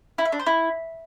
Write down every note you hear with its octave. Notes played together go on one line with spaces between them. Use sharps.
E4
E5
D4
C5
E4